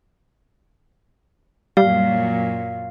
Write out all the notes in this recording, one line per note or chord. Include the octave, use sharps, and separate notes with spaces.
F#2 A#2 F#3 G3 F5